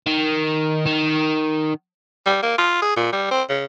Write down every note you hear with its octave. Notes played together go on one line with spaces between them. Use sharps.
D#3
D#3
G3
A#3
F4
G#4
A#2
G3
C4
C#3